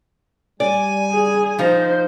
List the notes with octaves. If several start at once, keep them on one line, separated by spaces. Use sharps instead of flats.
G3 D5 G#5
G#4
F3 D#4 C5